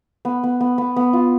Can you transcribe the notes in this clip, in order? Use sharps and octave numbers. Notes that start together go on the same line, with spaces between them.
B3
B3
B3
B3
B3
F4